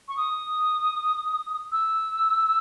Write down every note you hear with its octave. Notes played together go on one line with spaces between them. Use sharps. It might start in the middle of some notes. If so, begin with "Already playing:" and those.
C#6
D#6
E6